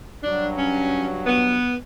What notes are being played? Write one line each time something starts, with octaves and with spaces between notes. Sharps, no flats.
G2 F#3 D4
C#4
B3